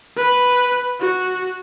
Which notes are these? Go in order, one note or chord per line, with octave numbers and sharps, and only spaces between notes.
B4
F#4